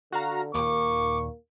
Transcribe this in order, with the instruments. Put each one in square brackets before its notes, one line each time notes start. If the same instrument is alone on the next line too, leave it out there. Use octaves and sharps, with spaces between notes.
[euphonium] D3 [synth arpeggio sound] F#4 F5 A#5
[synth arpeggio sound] D#2 A#2 [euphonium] A#3 [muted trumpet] C#6 [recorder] D6